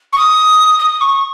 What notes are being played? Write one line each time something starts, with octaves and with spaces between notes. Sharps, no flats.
C#6
D#6
D#6
C#6